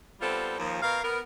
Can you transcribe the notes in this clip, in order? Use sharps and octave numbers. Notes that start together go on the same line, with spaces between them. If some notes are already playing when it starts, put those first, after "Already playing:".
G3 B3 C4 F4 A4
D#2 F3
B2 A#4 F5
B3 A#4